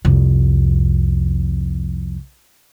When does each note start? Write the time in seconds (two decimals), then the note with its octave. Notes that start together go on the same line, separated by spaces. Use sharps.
0.05 C2 F2